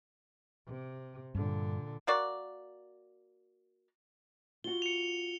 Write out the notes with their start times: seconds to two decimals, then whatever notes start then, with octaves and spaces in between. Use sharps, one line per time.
0.66 C3
1.35 G2 A#2 D3
2.07 A#3 F#4 D5
4.64 F4 F#4 G7
4.82 C#7 F7